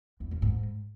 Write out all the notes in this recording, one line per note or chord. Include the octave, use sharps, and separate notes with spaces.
E2
C#3
G#2